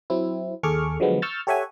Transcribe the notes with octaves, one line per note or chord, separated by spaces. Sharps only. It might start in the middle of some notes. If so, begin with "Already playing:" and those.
F#3 C4 E4
D#2 G#4 A4 C#6 D6 F6
D3 F3 F#3 G#3 B3
C#6 E6 F6 G6 A6
G4 A4 C#5 E5 F#5 G#5